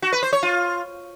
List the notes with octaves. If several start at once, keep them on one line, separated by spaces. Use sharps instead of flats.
F#4
B4
C5
C#5
F4